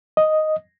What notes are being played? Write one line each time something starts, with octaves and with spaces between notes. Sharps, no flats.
D#5